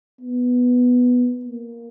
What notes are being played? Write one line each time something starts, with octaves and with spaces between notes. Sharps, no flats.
B3
A#3